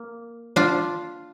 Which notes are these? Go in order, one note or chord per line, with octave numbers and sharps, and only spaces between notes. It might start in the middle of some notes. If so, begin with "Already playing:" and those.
Already playing: A#3
D4 F4